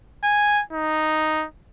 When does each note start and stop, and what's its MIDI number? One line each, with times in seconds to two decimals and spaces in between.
0.24 0.62 80
0.73 1.45 63